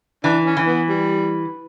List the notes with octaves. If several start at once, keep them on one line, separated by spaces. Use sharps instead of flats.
E3 D4
C#4
E3
B3
G3